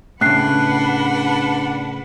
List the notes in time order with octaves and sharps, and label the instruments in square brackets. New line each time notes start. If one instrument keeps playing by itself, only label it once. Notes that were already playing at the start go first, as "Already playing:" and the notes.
[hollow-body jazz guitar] A2 C#3 [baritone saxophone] D4 [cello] B4 F#5 [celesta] F#6 C7